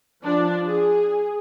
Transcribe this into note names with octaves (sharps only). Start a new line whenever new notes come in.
F3 D4
G#4